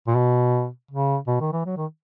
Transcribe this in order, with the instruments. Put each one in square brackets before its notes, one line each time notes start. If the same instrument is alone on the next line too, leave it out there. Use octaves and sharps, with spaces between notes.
[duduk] A#2
B2
C#3
B2
D#3
E3
F#3
D#3